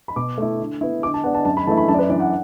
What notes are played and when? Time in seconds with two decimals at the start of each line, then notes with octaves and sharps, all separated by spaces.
0.08 B5
0.16 B2 D6
0.38 A3 E4
0.60 D3
0.81 B3 E4
1.03 D3 D6
1.14 A5
1.24 B3 D4 F#5
1.35 A5
1.45 F#2 A5
1.57 B5
1.67 E3 A3 E4 A5
1.77 B5
1.88 F#2 A5
1.94 D5
1.99 B4
2.09 E3 D4 D5
2.20 F#5